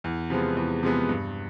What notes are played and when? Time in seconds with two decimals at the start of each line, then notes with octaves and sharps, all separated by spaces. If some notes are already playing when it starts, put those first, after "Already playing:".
0.04 E2
0.30 C3 F3 G#3 B3
0.57 E2
0.83 C3 F3 G#3 B3
1.09 G2